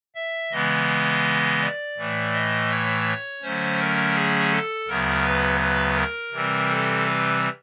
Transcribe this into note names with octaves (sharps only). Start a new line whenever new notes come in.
E5
C#3 E3 G#3 B3 D#5
D5
A2 E3 A3
D#5
C#5
D3 F#3 A3 C#4 C5
A#4
G#4
A4
D2 C#3 F#3 B3 A#4
B4
B4
A#4
C3 E3 G3 C4
A4
B4